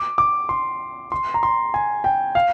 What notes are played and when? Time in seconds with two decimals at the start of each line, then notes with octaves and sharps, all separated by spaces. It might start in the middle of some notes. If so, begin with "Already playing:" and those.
Already playing: D6
0.18 D6
0.49 C6
1.12 C6
1.34 A#5
1.43 C6
1.74 G#5
2.04 G5
2.35 F5